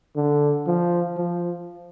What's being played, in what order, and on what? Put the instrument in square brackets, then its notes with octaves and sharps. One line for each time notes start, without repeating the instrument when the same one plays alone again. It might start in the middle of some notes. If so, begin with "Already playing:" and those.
[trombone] D3
F3
F3